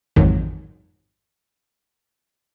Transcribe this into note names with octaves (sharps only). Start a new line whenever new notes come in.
A1 F2 G#2 D#3 F#3